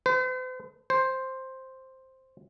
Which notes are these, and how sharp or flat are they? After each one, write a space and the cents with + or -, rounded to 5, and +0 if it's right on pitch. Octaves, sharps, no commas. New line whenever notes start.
C5 -45
C5 +5